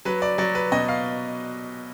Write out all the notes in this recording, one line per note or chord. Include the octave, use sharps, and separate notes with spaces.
F#3 B4
D5
F#3 D5
B4
B2 D#5
F5